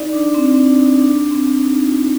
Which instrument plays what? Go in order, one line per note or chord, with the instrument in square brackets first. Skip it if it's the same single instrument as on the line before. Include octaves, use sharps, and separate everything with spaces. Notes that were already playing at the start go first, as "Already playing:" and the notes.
Already playing: [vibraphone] D#4 D5
D4
C4
C4
D4
D#4
D4
C4
D#4
F4